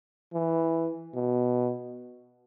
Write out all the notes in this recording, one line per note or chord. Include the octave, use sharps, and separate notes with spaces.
E3
B2